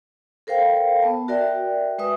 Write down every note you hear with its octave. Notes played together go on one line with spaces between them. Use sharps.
A4 A#4 C5 F5 G5
B3 A5
F#4 A#4 D5 E5 G5
G#3 B4 E5 D#6